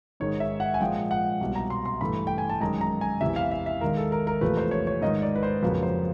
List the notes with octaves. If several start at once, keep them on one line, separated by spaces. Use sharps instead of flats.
G#2 D#3 G#3 C#5
E5
F#5
G#5
A#2 F3 G#3 G5
F#5
C2 B2 G3
A#5
C6
C6
G2 E3 A3 B5
G5
G#5
A5
F#2 D#3 G#3 A#5
A#5
G#5
E2 C3 E3 E5
F5
E5
E5
D#2 D#3 G#3 A#4
A4
A#4
A#4
E2 C3 F3 A3 B4
C5
C#5
C#5
G#2 D#3 G#3 D#5
D5
B4
C5
F2 C#3 F#3 A#3 B4
C5